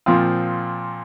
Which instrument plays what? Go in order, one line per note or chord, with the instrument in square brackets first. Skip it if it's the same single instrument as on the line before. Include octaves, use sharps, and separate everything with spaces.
[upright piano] A#2 F3 C4 F4